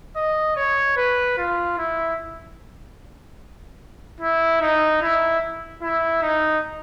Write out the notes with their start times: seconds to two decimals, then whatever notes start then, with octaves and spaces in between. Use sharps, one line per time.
0.16 D#5
0.57 C#5
0.97 B4
1.38 F4
1.78 E4
4.20 E4
4.61 D#4
5.02 E4
5.82 E4
6.22 D#4